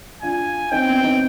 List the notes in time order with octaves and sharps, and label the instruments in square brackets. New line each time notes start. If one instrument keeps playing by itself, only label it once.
[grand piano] D4 F4 [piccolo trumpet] G#5
[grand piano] C4 D#4 [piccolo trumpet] G5
[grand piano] B3 D4
C4 D#4